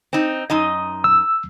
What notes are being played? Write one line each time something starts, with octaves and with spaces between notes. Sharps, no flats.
C4 D#4
F#2 D#4 D#5
E6